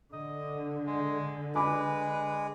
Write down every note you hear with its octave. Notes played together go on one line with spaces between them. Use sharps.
D3 D#5
G#3
G#3 B4 G#5 B5 D6